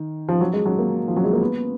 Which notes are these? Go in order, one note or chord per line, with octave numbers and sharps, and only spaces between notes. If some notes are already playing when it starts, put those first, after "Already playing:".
Already playing: D#3
F3
F#3
G#3
F#3
A#3
F3
F#3
G#3
A#3
B3